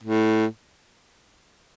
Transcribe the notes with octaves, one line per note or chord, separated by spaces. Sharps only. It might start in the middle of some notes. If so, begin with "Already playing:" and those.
A2